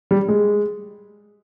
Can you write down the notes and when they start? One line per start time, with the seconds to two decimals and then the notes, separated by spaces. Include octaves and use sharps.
0.11 G3
0.28 G#3